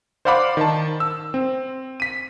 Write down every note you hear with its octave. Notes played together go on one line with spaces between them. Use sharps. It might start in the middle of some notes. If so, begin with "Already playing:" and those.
C5 D5 F5 F#5 B5 D6
D#3 A5
E6
C4
B6 D#7